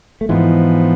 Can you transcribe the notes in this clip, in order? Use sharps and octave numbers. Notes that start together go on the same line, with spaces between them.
A3
G#2 E3 F3 G#3 B3